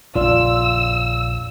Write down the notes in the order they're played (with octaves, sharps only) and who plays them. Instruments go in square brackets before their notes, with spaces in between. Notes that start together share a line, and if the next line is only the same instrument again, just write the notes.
[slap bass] A#1 F2 C#3 [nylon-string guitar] F4 [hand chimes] D5 F5 [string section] E6